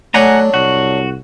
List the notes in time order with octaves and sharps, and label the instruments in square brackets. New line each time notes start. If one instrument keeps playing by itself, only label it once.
[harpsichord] F#3 D4 [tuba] A3 [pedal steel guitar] F#5 G#5 A#5
[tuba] C2 [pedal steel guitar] F#4